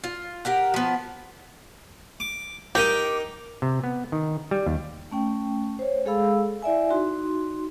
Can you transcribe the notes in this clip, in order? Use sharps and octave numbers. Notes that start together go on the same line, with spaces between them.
F4
G4 A#4 F#5
F3 B3
D6
D#4 G4 A#4 D#5
C3
B3
D#3
G3
D#2
A3 C#4 G5
C5 C#5
G#3 G#4 A4 F5 B5 E6
E4 D5 E5 G#5
D#4 F#4 C6